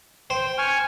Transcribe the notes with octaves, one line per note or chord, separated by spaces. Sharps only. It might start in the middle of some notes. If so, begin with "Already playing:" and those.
C5 G5
G#5 C#6 F6